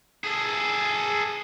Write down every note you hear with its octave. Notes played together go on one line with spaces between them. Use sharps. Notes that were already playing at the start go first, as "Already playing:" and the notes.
G#4 A4